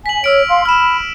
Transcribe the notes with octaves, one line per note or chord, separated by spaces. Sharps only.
G#5 B6 F#7
C#5 E6 F6 D7
F5 C6
B5 F6 E7